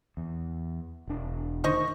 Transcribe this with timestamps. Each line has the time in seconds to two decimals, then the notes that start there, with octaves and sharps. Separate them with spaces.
0.17 E2
1.08 E1 D4
1.64 D#3 C5 D#5 C#6